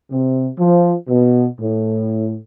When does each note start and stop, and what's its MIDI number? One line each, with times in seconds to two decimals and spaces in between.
0.11 0.47 48
0.57 0.92 53
1.07 1.46 47
1.59 2.37 45